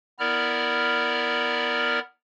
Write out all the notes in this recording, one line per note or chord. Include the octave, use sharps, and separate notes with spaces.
B3 E4 A#4 D5 A#5 F6